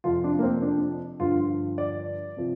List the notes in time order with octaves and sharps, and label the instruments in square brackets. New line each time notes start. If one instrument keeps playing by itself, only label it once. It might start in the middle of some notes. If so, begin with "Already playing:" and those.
[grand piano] F2 C3 F3 F4
D4
A#3
C4
D4
G2 D3 F3 F4
D5
C3 F3